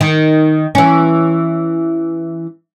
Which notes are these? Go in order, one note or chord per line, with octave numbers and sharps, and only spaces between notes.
D#3
E3 C#4